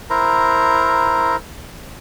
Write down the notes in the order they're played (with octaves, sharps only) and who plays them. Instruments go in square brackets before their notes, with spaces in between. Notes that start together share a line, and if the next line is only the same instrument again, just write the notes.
[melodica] E4 A#4 C5 A#5